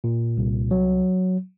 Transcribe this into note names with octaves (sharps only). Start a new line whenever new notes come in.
A#2
C2
F#3